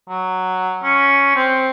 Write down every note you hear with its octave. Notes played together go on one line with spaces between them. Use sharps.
F#3
C#4
C4